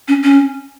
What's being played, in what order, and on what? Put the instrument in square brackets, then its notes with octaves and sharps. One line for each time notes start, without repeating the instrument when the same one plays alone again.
[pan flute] C#4
C#4